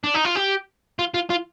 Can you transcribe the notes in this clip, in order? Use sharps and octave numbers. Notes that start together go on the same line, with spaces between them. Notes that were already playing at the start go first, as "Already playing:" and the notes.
D4
D#4
F4
G4
F4
F4
F4